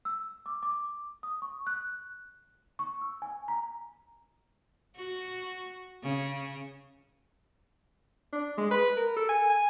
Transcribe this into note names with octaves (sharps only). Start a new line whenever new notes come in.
E6
D6
D6
D#6
C#6
F#6
C#6
E6
G#5
A#5
F#4
C#3
D4
G#3
B4
A#4
A4
G#5
G#5